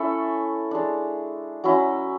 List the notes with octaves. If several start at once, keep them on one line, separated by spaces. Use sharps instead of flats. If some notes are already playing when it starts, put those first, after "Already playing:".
Already playing: A3 C#4 E4 A4
G#3 D4
F#3 C#4 E4